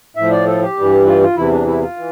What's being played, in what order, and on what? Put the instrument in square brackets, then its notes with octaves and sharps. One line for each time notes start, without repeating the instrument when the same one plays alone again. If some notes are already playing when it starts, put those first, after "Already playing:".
[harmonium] A2 F3 E5
D5
A4
G4
G2 E3 G3
F4
F4
E2 C3 E3 E4
D4
E4
F4
E3